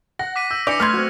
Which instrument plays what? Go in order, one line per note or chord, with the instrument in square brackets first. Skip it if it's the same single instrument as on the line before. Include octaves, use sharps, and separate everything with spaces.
[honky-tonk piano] F#5 [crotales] A#6
[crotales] D6 B6 D#7
[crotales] E6 [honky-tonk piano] G6
[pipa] E3 D5 [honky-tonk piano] D4 D6 G6 [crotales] A#6 C#7 F7
[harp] A3 [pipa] B4 D5 C6 [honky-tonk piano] F6 G#6
[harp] C4 F#4